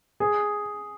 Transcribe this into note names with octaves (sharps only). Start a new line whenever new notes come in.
G#4